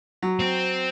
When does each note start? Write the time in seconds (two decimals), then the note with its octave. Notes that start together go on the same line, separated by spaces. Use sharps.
0.22 F#3
0.39 C4